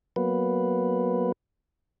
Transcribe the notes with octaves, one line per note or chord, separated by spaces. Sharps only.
F#3 A#3 B3 B4